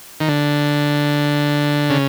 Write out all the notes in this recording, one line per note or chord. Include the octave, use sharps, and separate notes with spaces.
D#3
D3
C#3